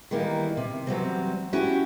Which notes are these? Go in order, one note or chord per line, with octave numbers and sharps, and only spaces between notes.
D#3 E3 G3 A#3 D#4 E4
C3
E3 F#3 G3 C4
C#4 E4 F#4 G4